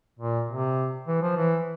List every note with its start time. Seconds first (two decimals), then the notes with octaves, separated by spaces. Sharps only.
0.19 A#2
0.49 C3
1.08 E3
1.22 F3
1.37 E3